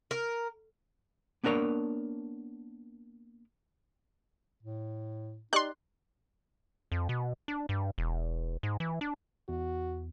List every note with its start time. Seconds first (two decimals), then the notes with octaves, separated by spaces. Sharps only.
0.11 A#4
1.44 A#3 B3 D4 A#4 C#5
4.63 A2
5.53 D#4 G4 D5 D#5 C6 F#6
6.92 F2
7.09 B2
7.48 D4
7.69 G2
7.98 E1
8.63 G#2
8.80 E3
9.01 D4
9.49 E2 F#4